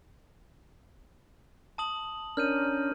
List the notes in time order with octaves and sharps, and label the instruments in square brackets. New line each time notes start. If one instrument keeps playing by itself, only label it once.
[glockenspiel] A5 D#6 F#7
[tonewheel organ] C#4 D4 A#4 [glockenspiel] F6 G6 D#7